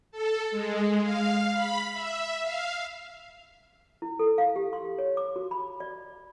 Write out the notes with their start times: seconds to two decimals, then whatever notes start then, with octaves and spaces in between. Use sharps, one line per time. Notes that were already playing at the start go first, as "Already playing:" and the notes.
0.12 A4
0.51 G#3
1.03 F5
1.53 B5
1.93 E5
2.43 F5
4.02 E4
4.19 A4
4.38 F5
4.56 G4
4.73 C6
4.98 C#5
5.17 D6
5.36 F#4
5.51 B5
5.80 D5